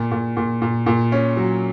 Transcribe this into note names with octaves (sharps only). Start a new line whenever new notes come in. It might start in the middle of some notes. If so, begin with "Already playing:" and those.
Already playing: A#2
A#2
A#2
A#2
A#2
C#4
F#3